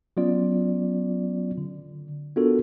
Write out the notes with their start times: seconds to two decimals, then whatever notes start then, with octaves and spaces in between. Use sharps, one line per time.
0.17 F#3 B3 C#4 F4 D5
1.58 D3
2.36 B3 D4 F4 F#4 A4 A#4